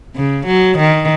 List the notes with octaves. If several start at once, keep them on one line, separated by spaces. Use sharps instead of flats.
C#3
F#3
D#3